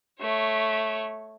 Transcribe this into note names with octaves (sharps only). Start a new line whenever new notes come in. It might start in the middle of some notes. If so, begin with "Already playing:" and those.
A3 C#5